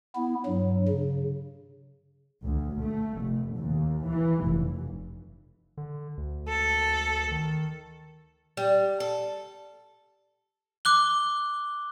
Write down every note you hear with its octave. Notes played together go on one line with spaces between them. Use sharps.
B3 E4
G2 F#3
C#3
D2
A3
F1
D#2
E3
F1
D3
D2
A4
D#3
G3
A4
D6 F#6 G7